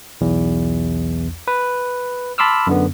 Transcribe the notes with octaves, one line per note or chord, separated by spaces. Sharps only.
B1 E2
B4
A5 B5 C6 D6 E6 F6
F#2 D3 B3